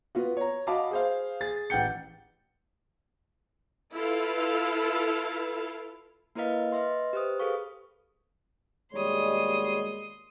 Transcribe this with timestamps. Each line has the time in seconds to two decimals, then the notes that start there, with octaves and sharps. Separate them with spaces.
0.15 B3 F4 F#4
0.37 C#5 A#5
0.67 F#4 D#5 F5 A5 B5 D6
0.91 G#4 C5 F5
1.41 G#4 A6
1.70 A1 F#5 G5 G6 C#7
3.93 E4 F4 A4 B4 F5
6.35 A#3 E4 A#4 B4 D#5 F5
6.72 B4 D#5 E5 C6
7.13 G4 B4 C5 D#6
7.40 G#4 A4 B4 F5 C#6
8.93 D#2 B2 G3 G#3 C#5 C6 D#6